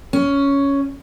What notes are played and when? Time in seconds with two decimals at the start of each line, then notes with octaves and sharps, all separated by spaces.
0.13 C#4